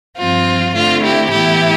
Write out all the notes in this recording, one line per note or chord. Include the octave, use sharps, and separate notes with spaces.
G2 F3 C4 F4
D3 A3 C4 F4
E4 G4
A2 E3 B3 E4 G4